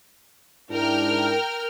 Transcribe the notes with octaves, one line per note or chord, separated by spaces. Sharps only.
G#2 D4 E4 A#4 G5 F6